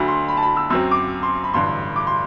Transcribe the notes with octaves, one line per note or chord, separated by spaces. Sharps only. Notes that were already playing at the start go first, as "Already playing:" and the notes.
Already playing: D2 D3 F#3 B5
C6
B5
A5
B5
E6
F#2 F#3 C4 E6
D6
C6
B5
A1 G2 D3 C6
D6
C6